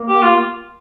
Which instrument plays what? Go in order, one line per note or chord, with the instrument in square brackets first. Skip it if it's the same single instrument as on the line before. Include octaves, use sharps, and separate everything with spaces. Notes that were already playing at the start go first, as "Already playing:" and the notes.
Already playing: [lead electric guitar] A#3
[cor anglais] G4
F4